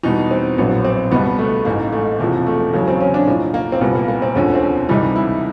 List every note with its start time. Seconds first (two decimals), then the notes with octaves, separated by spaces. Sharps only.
0.03 E2 B2 G3 D#4
0.31 C4
0.58 A#1 A2 F#3 B3
0.85 C4
1.11 C#2 B2 G3 B3
1.39 A3
1.65 A1 G#2 E3 A#3
1.92 A3
2.19 E1 E2 C3 F3 A#3
2.46 A3
2.73 E2 C#3 F#3 A#3
2.88 C4
3.01 C#4
3.14 D4
3.27 B1 A2 F3 A#3
3.54 A#3
3.72 C4
3.81 C2 A#2 G3 B3
3.95 A#3
4.08 A#3
4.22 C4
4.35 E1 D2 D3 F3 C#4
4.54 C4
4.89 C#2 C3 E3 G3 D#4
5.16 E4